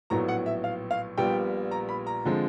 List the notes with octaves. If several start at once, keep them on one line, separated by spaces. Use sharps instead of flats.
A#1 A2 F#3 B3 A#5
F#5
E5
F5
F5
A#1 A#2 G3 B3 G5
A#5
B5
A#5
D3 F3 G#3 C4